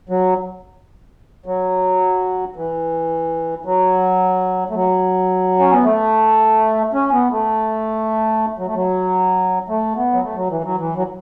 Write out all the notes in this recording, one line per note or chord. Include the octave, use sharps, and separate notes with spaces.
F#3
F#3
E3
F#3
A3
F#3
C#4
B3
A3
C#4
B3
A3
F#3
A3
F#3
A3
B3
F#3
A3
F#3
E3
F#3
E3
F#3